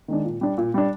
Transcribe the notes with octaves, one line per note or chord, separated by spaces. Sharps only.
D#3 G#3 D4
A#2
G3 D4
A#2
G3 D4